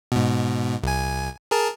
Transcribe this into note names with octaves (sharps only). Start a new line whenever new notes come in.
G#2 B2
C2 G#5
G#4 A#4 A5